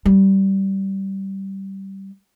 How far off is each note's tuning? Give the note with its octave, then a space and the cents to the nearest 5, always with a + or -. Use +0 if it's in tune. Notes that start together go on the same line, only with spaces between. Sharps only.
G3 -15